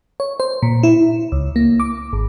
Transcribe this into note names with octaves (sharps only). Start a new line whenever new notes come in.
C#5
C5
A#2
E4
C#2
A#3
D6
G#1